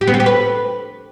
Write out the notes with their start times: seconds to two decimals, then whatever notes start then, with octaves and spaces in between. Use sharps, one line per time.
0.01 G4
0.07 B3
0.14 C4
0.20 G4
0.26 B4